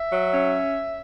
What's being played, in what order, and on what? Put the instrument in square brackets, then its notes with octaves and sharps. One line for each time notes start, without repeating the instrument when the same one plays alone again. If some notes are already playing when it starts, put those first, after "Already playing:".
Already playing: [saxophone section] E5
F#3
C#4